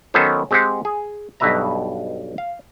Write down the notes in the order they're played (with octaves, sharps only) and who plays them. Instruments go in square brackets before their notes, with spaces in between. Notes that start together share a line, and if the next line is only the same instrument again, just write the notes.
[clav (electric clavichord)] D#3 F#3 B3 C#4 A4 C5
G#3 C4 G4 C5 F#5 G5
G#4
B1 G2 B2 B4 E5 A#5
F5